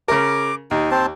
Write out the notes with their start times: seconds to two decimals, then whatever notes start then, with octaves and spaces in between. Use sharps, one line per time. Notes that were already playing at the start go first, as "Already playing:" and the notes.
0.08 C#3 A#4 D6
0.71 D#2 D#4
0.91 C4 C5 A5